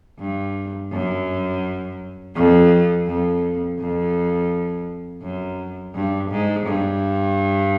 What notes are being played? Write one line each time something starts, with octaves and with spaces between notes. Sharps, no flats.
G2
F#2
F2
F2
F2
F#2
G2
G#2
G2